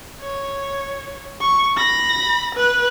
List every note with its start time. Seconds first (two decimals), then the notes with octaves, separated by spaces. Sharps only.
0.21 C#5
1.41 C#6
1.77 B5 A#6
2.55 B4 F#6